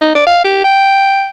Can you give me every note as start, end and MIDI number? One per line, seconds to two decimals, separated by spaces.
0.01 0.12 63
0.15 0.25 74
0.27 0.40 77
0.45 0.60 67
0.64 1.27 79